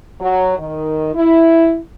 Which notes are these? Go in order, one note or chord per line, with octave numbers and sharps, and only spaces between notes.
F#3
D#3
E4